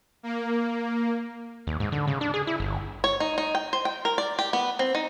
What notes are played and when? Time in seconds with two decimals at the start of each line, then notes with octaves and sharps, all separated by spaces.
0.23 A#3
1.67 D#2
1.80 G#2
1.92 D3
2.07 C#3
2.21 D4
2.34 G#4
2.47 E4
2.60 G1
3.04 C#5
3.20 D#4
3.38 D#4
3.55 G5
3.73 C5
3.85 G5
4.05 A#4
4.18 D5
4.39 G4
4.53 B3
4.79 C4
4.95 D#4